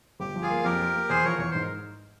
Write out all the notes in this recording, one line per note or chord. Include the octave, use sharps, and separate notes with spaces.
G1 G4
F3
F4 G#4
A#3
F2 G4 A#4
F3
A#3
E2 G#4 C5
F3 A#4 C#5
E2 C#5
G#2 C5
A#4